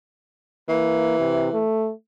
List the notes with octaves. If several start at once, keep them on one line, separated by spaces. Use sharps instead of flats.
E3 A#3
C3
A3